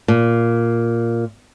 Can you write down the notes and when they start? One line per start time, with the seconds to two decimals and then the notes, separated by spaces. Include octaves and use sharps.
0.08 A#2